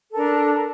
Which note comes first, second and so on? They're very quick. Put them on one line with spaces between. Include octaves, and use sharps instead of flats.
A4 A#4 D4